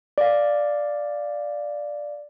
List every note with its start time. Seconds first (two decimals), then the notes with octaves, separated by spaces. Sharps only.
0.18 D5 F5